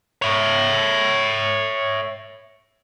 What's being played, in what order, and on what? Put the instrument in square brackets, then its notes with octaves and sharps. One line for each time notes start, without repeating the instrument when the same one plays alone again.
[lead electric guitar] C#5 E5